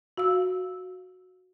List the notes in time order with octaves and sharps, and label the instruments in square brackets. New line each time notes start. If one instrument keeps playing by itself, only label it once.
[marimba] F#4 F5 E6